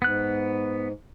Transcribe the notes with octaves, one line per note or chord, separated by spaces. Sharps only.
G#2 B3 F#6